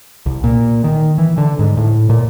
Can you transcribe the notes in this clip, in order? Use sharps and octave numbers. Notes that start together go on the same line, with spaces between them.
C2
A#2
D#3
E3
D3
G#2
A2
A#2